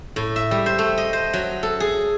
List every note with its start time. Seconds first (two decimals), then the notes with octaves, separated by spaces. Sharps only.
0.16 A2
0.36 E5
0.51 G3
0.66 C5
0.78 A3
0.98 D#5
1.13 C5
1.33 F#3
1.63 A4
1.80 G#4